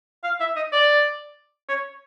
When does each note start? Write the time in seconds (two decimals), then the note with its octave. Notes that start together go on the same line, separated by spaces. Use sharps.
0.24 F5
0.40 E5
0.56 D#5
0.72 D5
1.68 C#5